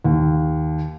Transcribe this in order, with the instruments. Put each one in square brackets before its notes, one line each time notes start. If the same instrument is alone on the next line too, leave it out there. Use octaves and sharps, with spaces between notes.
[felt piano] D#2